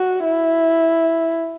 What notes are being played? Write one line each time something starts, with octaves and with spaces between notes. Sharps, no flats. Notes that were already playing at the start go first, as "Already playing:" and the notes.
Already playing: F#4
E4